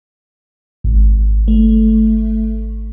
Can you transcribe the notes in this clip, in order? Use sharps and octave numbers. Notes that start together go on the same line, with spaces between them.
G#1
A3